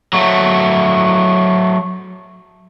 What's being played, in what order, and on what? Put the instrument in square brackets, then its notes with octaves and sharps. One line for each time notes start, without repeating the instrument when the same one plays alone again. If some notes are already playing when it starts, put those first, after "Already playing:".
[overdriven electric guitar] F#3 A3